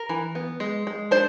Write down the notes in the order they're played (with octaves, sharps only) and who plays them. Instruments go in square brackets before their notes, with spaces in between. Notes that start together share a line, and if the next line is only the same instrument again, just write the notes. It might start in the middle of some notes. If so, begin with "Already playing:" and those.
Already playing: [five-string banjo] A#4
E3
B3
G#3
G#3
D4 C5